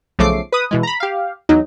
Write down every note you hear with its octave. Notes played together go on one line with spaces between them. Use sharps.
B1 C#3 F3 A3 D6 C7
B4 D#6
B2 E3 G#3
A#5 B5
G4 F5
E2 F#3 D#4